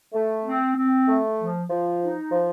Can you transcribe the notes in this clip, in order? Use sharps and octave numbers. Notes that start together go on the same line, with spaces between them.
A3
C4
C4
A3
F3
F3
D#4
F3